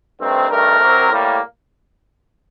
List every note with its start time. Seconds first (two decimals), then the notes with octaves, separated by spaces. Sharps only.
0.20 G2 D#3 A3 C4
0.49 G2 D#3 A3 A#4
0.80 C2 C3 F#3 C4
1.10 A2 G3 A#3